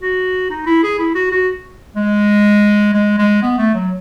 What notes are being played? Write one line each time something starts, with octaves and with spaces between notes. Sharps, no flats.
F#4
D#4
E4
G#4
E4
F#4
F#4
G#3
G#3
G#3
B3
A3
F#3